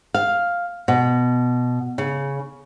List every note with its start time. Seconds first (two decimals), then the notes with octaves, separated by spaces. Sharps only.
0.14 F5
0.88 B2
1.98 C#3